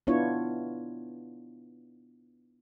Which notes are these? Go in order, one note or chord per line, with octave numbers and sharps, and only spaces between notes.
B3 D4 E4 F4 C#5